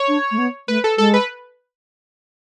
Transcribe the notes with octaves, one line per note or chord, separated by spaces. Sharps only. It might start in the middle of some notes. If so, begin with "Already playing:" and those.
Already playing: C#5
D4
A3
B3
A3 B4
A4
G#3 A4
B4